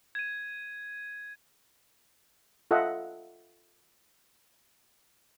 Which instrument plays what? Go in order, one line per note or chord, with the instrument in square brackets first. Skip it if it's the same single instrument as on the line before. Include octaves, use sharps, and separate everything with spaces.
[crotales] G#6 D#7
[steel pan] F4 A4 D#5 E5 F#5